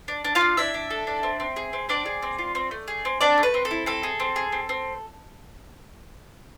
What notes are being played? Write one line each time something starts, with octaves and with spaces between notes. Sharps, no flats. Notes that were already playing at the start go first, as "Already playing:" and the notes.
D4
D4
F4 F5
D4
D4 E4 E5
D4
A4
D4
C4
C4
G#4
C4
C4 D4 D5
G#4
C4
F4
C4
A3
G#4
C4
C4 D4 D5
A3
B4
C4
A4
E4
C4 A4
G#4
C4
G#4
C4
C4